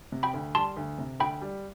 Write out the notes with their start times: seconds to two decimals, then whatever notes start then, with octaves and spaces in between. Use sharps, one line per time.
0.12 C3
0.23 G5 B5
0.34 D2
0.55 G3 A5 C6
0.77 D2
0.98 C3
1.20 D2 G5 B5
1.42 G3